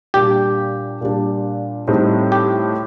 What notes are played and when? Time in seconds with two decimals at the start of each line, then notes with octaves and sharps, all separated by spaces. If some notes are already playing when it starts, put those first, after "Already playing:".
0.14 A#2 G3 D4 G4
1.01 A#2 G3 D4
1.87 A2 G3 C4 D#4
2.32 G4